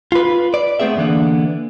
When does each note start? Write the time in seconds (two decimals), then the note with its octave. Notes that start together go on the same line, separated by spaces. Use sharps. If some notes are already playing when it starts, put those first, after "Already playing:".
0.12 F4 B4
0.54 D5
0.80 A3 B3 C4 G#4 E5
0.96 D3 E3 A#3 B3 D4